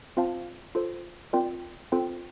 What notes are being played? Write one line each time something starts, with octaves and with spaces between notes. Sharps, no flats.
C4 F4 C5 F5 A5
F4 A4 C5
C4 F4 A#4 D5 G5
C4 F4 A4 C5 G5